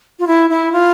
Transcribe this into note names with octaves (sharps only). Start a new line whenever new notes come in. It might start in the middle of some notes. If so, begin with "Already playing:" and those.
F4
E4
E4
F4